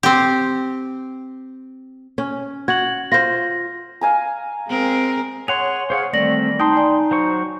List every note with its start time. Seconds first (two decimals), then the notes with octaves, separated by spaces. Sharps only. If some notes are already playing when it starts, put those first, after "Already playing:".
0.03 C4 G4
2.18 C#4
2.68 F#4 G#6 F#7
3.12 F4 C5 A#6
4.01 F5 G#5 A#5
4.68 G#3 C4 A#4
5.48 G#4 C#5 F#5 C6 F7
5.90 G#4 C5 C#5 F5 F#5
6.13 D#3 E3 G3 A3 C4 D5 A#6 F#7
6.60 D#4 G5 A5 C6 D#6
6.76 D5 G#5 A#5
7.11 F#3 C5 C#6